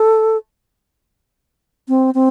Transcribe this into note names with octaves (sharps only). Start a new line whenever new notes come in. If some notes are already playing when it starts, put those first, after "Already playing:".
Already playing: A4
C4
C4